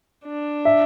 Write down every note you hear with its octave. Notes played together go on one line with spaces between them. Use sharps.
D4
E5